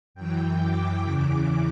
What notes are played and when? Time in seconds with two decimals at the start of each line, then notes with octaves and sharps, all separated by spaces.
0.15 F#2 E3 G5
0.60 D6
1.03 E2 C#3 E3 D6